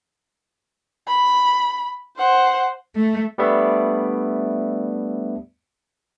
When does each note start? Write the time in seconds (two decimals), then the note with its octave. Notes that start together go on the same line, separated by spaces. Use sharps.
1.08 B5
2.18 C5 F#5
2.96 A3
3.38 G3 A3 B3 D4 E5